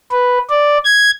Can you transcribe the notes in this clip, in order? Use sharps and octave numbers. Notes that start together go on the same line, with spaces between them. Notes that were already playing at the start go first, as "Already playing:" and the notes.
B4
D5
G#6